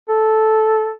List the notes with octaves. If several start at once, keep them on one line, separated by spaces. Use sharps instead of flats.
A4